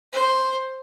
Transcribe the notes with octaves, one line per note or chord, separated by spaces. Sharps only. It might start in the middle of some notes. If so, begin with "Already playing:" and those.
C5